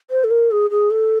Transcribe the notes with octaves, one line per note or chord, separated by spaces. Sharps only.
C5
A4
A#4
G#4
G#4
A4